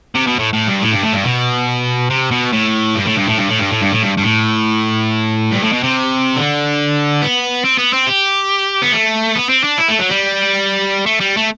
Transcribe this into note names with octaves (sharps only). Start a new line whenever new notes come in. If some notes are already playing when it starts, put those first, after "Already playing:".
C3
B2
A2
A2
G2
A2
G2
A2
G2
B2
C3
B2
A2
G2
A2
G2
A2
G2
A2
G2
A2
G2
A2
G2
G2
A2
G2
A2
B2
C3
D3
B3
C4
B3
C4
G4
B3
A3
B3
C4
D4
E4
A3
F#3
G3
A3
G3
A3